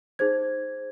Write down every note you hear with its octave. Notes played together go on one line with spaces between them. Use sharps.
D#4 G#4 C5 G#6